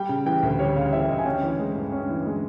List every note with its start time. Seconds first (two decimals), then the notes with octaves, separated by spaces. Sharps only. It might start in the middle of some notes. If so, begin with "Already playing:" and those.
Already playing: G3 G5
0.09 C#3
0.26 E3 G5
0.43 D2
0.59 G3 C#5
0.76 C#3 F5
0.93 E3 E5
1.09 D2 D#5
1.19 G#5
1.26 C#4 G5
1.43 E3
1.59 G#3
1.76 G2
1.92 C#4
2.09 E3
2.26 G#3